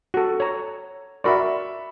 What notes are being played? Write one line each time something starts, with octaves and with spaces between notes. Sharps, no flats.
F#4 A4
C#5 A#5
F#4 A#4 D5 E5 B5 C#6